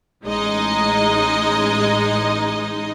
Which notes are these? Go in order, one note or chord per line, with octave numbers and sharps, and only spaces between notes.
A1 G#3 D#4 D#5